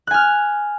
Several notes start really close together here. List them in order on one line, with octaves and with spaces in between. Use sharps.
F#6 G#5 F6